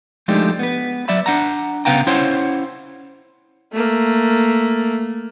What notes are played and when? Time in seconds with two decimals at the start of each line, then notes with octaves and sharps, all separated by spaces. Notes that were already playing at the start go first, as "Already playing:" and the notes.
0.28 F3 G#3 A3 D4 D#4 G4
0.59 B3 B4
1.08 F#3 D5 E5 B5
1.26 D4 F#5 A#5
1.85 C2 C#3 B3 F5 G5 A#5
2.07 C#4 E4 C5 C#5 F#5 C6
3.73 A3 A#3